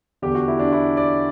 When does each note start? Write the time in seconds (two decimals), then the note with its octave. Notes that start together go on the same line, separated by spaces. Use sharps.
0.22 E2 D3 G4
0.35 F#4
0.48 E4
0.59 D4
0.72 E4
0.97 D5